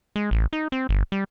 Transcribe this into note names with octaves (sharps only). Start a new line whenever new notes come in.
G#3
A1
D#4
C4
G1
G3